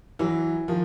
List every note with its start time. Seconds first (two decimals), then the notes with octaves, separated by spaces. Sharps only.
0.19 E3 F#3
0.68 D#3 F3